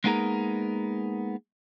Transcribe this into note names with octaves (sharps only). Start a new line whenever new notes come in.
G#3 A#3 B3 D#4 G#4 A#4